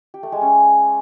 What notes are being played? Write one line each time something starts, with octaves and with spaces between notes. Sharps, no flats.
G4
A3
G#3
C#4